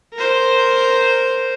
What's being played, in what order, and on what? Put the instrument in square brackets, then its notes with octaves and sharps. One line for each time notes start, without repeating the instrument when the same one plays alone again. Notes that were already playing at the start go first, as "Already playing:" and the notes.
[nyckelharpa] A#4 C5